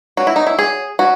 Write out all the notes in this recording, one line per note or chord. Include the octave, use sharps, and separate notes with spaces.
F#3 C#4 F#4
E4
D#4
E4
G#4
F#3 C#4 F#4